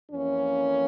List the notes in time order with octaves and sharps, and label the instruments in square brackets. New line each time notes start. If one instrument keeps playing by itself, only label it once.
[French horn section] F2 E3 A#3 C#4